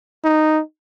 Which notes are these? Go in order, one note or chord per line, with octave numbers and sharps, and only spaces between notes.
D#4